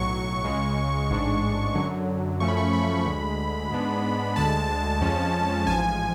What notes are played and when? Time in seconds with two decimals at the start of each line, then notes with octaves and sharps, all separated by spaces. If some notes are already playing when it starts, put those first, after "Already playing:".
Already playing: B1 A2 F#3 C#6
0.44 C#2 C#3 G#3
1.10 A1 G#2 G#3 D4
1.75 F#2 D3 F#3
2.40 F#2 F3 A3 C#4 C#6
2.48 B5
2.57 C#6
2.73 B5
3.06 D2 D3 G#3
3.71 G#2 G#3 B3 D4
4.36 D2 D3 G#3 A5
5.01 F2 F3 G#3 C#4
5.67 A1 G#2 F3 G#5